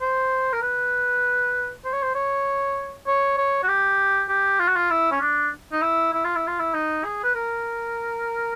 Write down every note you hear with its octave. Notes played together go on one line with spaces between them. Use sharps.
C5
A#4
B4
C5
C#5
C5
C#5
C#5
C#5
F#4
G4
G4
F4
F#4
F4
E4
C#4
D4
D#4
E4
E4
F4
E4
F4
E4
D#4
G#4
B4
A#4